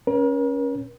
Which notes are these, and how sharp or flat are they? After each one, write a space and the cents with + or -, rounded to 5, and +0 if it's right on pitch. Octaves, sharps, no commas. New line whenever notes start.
C#4 +0 A#4 +40